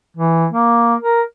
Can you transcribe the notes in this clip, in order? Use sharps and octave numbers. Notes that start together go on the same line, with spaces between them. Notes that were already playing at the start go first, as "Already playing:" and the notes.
E3
A#3
A#4